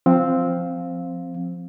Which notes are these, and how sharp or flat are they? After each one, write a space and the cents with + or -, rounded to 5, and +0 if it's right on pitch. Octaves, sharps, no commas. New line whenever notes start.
F3 +0 C4 +0 F5 +5